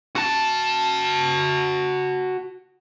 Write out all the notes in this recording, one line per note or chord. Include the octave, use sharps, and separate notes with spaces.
F#4 A5